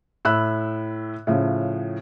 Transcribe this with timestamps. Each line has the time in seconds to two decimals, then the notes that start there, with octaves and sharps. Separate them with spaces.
0.25 A2 B5 E6 F#6
1.27 A2 C#3 F3